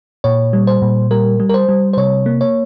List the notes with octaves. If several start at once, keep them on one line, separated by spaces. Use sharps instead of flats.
A#2 C#5
G3
C5
A#2
G3 A#4
G3
A#4
C5
G3
C5
C3 C#5
A#3
C#5